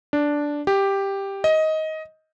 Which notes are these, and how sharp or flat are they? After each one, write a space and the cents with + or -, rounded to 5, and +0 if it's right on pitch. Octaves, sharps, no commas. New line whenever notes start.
D4 -5
G4 +5
D#5 +15